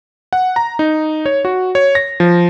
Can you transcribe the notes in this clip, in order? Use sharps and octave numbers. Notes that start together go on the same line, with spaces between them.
F#5
A#5
D#4
C#5
F#4
C#5
A#6
F3